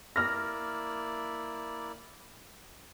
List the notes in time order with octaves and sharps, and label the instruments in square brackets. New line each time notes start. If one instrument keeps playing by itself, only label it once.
[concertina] A#3 E4 D5 [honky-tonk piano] F6 A#6